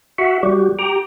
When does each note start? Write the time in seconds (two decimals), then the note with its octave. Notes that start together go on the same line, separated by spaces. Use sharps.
0.18 F#4 E5 F#5
0.43 G3 F#4 G4
0.79 G4 G5 A#5